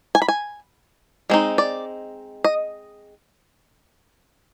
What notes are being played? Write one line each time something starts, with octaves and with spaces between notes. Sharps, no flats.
G#5
B5
G#5
G#3 C4 D#4
D5
D#5